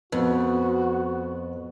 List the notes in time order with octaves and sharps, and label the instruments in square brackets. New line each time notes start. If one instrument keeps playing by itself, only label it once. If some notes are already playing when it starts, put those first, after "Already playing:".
[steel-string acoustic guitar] F2 [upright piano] B3 [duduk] F#4